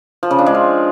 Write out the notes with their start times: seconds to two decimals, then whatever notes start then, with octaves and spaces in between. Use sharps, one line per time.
0.23 F3
0.31 C#3
0.39 D4
0.46 G#3
0.54 F4